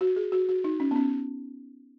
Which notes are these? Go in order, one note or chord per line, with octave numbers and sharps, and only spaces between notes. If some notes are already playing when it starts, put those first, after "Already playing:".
F#4
G#4
F#4
F#4
D#4
C#4
B3
C#4